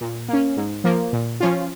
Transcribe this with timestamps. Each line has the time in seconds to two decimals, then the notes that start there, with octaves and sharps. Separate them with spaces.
0.01 A#2
0.28 A#3 C#4
0.57 G#2
0.84 F3 A#3
1.13 A#2
1.40 F3 C#4 F4